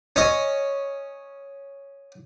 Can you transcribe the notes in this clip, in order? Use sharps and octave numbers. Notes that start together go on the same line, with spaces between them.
C#4 D#5